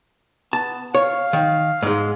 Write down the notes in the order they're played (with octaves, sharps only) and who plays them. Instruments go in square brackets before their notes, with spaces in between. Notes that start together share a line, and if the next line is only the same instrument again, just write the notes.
[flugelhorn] B3 [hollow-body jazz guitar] A5
[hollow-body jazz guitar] C#5 [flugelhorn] F5
[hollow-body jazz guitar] D#3
G#2 G#3